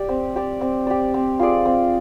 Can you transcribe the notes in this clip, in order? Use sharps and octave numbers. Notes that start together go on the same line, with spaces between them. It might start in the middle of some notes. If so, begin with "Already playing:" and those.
Already playing: G4 D5
C4
G4 D5
C4
G4 D5
C4
F4 G#4 D5
C4